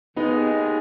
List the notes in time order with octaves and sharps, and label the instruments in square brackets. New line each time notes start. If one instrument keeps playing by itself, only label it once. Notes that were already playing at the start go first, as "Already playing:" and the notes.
[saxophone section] D#2 C#3 G#3 [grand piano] B3 D#4